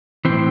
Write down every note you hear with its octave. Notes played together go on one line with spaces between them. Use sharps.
A2 E3 C4